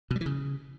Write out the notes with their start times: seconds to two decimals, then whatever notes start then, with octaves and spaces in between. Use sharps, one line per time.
0.11 B2
0.16 G3
0.21 E3
0.26 C#3